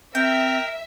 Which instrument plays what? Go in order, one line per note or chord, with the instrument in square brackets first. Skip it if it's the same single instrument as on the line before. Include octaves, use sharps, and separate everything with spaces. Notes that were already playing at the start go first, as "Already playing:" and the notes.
[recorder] C4 [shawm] A#4 [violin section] E5 [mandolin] G5